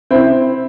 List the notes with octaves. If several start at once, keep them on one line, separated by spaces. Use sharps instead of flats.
C4 E4